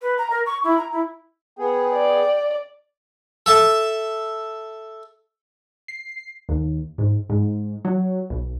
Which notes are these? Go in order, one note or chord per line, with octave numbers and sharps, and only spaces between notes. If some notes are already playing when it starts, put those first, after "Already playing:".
B4
A#5
A#4
C#6
E4
A#5
E4
B3 G#4 G5
D5
A4 E5 A5
C7
D#2
G#2
G#2
F#3
B1